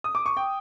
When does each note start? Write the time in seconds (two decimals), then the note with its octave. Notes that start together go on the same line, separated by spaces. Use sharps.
0.04 D#6
0.15 D6
0.26 C#6
0.37 G5